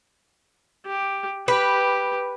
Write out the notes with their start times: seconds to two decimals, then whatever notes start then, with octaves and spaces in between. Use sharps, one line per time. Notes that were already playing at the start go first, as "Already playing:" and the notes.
0.86 G4
1.48 G4 B4